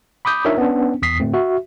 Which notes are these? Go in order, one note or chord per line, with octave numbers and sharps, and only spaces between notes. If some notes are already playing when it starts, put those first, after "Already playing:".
B5 D6 D#6 G6
D4 D#4 F4 A#4 C#5 E5
B3 C#4 D4
E2 D#6 B6 C7
A2 D3 A3 C4
F#4 E5